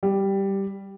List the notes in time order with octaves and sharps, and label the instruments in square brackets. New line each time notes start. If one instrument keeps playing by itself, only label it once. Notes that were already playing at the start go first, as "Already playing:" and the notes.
[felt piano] G3